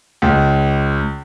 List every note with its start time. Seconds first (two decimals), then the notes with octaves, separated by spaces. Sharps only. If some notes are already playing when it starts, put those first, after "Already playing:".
0.22 C#2